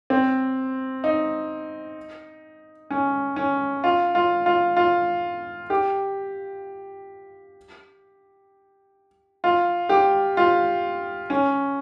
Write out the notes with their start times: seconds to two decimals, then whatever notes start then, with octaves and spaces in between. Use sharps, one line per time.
0.10 C4
1.04 D#4
2.90 C#4
3.36 C#4
3.84 F4
4.15 F4
4.46 F4
4.77 F4
5.70 G4
9.44 F4
9.89 G4
10.37 F4
11.30 C#4